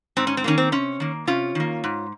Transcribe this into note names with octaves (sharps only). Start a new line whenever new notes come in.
G#2 C4
C#4
C4
D#3 F#3 A#3 C#4
C4
C3 C#4
D#3 A#3
C3 C#4 F4
D#3 A#3
G#2